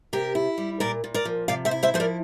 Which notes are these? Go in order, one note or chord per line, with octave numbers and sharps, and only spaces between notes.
C3 G4 A#4
E4
G3
A#2 A#4 D5
A#2
A#4 D5
F3
C3 D5 F5
C5 E5
E4
C5 E5
F3 C5
A#4 D5